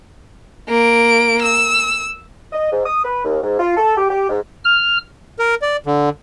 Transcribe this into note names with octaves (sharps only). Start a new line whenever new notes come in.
A#3 D7
E6
D#5
G#2
D#6
B4
D#2
G#2
F4
A4
G4
G4
G#2
F6
A#4
D5
D3